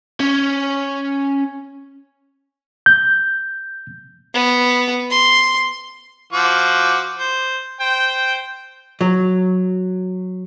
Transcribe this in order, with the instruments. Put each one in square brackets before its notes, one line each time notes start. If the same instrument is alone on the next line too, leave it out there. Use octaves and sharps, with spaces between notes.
[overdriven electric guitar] C#4 C#5
[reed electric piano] G6
[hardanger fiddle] B3
C6
[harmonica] F3 F#4 D6
C5
C5 G5
[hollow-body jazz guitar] F#3